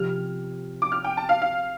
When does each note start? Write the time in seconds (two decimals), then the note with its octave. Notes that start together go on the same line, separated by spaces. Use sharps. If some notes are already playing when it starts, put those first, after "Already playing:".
Already playing: C3 F3 C4 G4 F6
0.82 D6
0.92 F6
1.04 G5
1.17 A5
1.29 F5
1.42 F5